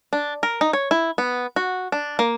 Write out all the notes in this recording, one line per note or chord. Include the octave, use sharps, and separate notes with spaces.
D4
A#4
D#4
C#5
E4
B3
F#4
D4
A#3